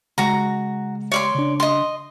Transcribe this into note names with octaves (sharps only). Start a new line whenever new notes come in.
C#3 G#3 F#4 A#5
C#5 D5 C6
C#3 D4
D#5 C6